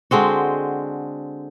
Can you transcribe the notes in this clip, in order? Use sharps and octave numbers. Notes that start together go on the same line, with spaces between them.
D3 G#3 C4 F#4